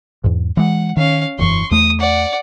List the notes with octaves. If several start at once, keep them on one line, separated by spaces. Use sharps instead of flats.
E2 G#2
E3 G#3 F#5
D#3 C#4 F5
E1 F#2 E3 C6 C#6
E2 A3 D#6
D5 F#5